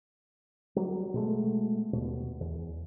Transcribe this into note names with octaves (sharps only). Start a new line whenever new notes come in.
F#3 G3
B2 G#3 A3
D#2 B2
E2